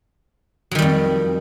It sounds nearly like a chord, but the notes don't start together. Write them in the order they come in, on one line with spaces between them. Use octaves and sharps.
F#3 D#3 G3 F2